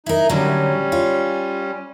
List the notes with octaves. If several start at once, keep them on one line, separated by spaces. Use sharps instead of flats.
D#4 E4 A#4
A2 D3 F#3 G3 C#4
F4 C#5